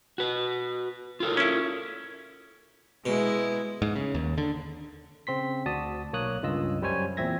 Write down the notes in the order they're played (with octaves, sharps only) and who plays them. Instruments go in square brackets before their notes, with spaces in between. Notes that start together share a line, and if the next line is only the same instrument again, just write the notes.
[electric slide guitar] F#4 B4
F4 A4 A#4
[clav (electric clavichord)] C#4 E4
[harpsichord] B2 [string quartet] G#3 E4
[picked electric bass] G#2
C#3
D#2
D3
[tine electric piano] C#3 C4 C6 B6
D2 F#4 D5 A5 D#6
B1 A#3 C#5 D#6 F#6
C#2 G2 F4 D#5 E6
F#2 G3 C5 C#5 G#5
E2 A#2 C4 E5 G#6 A#6